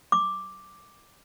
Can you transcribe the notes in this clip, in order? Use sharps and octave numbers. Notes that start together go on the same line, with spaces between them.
D6